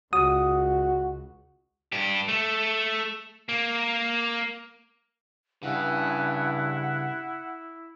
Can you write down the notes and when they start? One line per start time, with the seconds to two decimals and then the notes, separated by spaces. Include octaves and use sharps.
0.13 C#2 F#4 D#6
1.92 G2 G4
2.28 A3
3.49 A#3
5.63 G2 C#3 E4 F#5